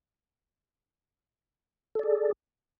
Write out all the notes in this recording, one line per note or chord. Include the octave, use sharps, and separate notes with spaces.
G#4 A4 D5